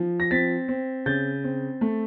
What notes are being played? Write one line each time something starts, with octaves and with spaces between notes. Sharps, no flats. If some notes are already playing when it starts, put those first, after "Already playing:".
Already playing: F3
A#6
C4 A6 B6
C4
C#3 G6 A6
C4
A3